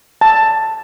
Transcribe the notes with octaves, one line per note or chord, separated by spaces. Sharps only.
A5